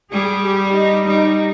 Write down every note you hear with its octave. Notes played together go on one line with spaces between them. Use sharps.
G3 G#4
G4
D#4
G3 D#4